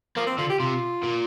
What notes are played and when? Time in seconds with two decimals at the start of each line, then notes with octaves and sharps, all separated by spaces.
0.17 F3 A#3
0.27 C4
0.38 D3 F4
0.50 G4
0.60 C3 F4
1.03 A#2